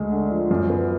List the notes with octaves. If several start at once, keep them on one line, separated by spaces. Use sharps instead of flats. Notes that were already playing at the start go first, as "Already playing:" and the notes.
Already playing: D2 G#3
D3
F3
F#2
B3